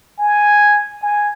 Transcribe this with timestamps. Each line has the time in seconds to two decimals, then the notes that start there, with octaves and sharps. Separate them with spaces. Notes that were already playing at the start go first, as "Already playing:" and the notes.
0.19 G#5
1.02 G#5